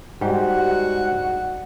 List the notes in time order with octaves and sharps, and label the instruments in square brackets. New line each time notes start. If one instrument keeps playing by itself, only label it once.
[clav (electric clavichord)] G#2 [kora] G3 [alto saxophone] F#4 [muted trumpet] F#5